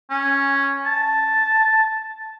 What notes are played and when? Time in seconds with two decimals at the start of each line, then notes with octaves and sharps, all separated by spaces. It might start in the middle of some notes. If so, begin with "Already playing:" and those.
0.11 C#4
0.86 A5